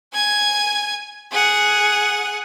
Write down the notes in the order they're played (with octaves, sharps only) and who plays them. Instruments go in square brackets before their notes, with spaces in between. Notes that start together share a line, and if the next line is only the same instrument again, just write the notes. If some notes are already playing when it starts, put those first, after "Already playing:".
[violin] G#5 G#6
G#4 F#5